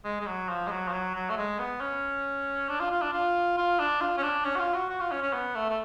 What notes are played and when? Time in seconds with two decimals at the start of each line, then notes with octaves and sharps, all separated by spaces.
0.05 G#3
0.21 G#3
0.26 F#3
0.49 F3
0.67 G#3
0.71 F#3
0.88 F3
0.92 F#3
1.15 F#3
1.30 A3
1.37 G#3
1.59 B3
1.81 C#4
2.69 D4
2.80 F4
2.91 F4
3.02 D4
3.13 F4
3.57 F4
3.79 D4
4.01 F4
4.17 C#4
4.23 D4
4.44 C#4
4.56 F#4
4.59 F4
4.74 F#4
4.89 F#4
5.00 F4
5.11 C#4
5.22 C#4
5.33 B3
5.55 A3
5.69 A3